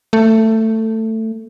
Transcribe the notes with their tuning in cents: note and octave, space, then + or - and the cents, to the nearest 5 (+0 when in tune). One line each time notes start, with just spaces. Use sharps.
A3 +15